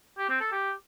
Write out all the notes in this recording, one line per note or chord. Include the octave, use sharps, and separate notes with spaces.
G4
C4
A4
G4